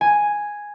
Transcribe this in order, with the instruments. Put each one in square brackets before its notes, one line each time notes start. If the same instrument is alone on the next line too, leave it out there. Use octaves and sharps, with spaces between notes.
[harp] G#5